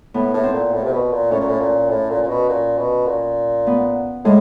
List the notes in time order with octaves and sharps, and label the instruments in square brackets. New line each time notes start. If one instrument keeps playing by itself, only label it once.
[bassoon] A2 [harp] B3
[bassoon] A2
[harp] C4
[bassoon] A#2
A2
C3
B2
A#2
[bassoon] A2 [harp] C#4
[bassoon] A#2
A2
A#2
A2
A#2
A#2
B2
A#2
B2
A#2
[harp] B3
[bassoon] A2 [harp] G#3